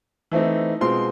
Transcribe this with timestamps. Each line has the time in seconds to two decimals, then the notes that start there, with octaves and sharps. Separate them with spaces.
0.32 E3 A3 C4 D#4
0.81 B2 G#3 C4 F4 C6